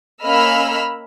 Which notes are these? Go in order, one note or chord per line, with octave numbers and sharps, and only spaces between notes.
A#3 C#4 D#5 B5 E6 F6